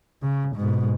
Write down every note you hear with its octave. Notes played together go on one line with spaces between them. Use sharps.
C#3
G#2 B2